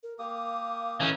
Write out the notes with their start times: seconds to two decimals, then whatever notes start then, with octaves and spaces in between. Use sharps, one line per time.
0.03 A#4
0.19 A#3 G4 F5 D#6
1.00 E3 C#4 D#4 G#4